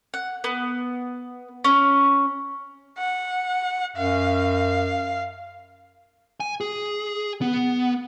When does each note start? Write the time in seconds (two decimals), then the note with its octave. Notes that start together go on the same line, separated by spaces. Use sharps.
0.14 F#5
0.44 B3
1.64 C#4
2.98 F#5
3.96 F#2 F5
6.40 G#5
6.61 G#4
7.42 B3